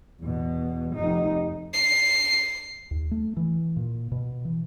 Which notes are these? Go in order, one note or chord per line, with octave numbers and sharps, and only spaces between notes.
E2 B2
F1 D#4
C7
D#2
A3
E3
A#2
B2
E3